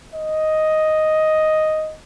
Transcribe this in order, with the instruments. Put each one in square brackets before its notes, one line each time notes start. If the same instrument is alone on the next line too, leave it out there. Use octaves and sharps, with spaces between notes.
[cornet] D#5